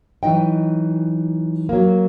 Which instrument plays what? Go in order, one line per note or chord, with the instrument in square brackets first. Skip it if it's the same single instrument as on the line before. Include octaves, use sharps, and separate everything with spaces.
[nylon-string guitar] E3 F#3 D#4 D#5 G5
F#3 A#3